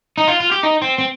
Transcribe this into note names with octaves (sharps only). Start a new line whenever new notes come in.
D#4
F4
F4
G4
D#4
C4
C4